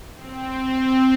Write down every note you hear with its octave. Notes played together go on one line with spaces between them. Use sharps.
C4